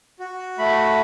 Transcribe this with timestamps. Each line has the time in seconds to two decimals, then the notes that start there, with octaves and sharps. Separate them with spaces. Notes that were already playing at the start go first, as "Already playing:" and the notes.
0.19 F#4
0.59 A3 B5